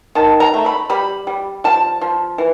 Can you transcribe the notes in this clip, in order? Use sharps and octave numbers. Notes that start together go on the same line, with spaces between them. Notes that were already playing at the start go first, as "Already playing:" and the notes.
D#3 A5
A#5
A3
B5
G3 B5
G3
F3 A5
F3
E3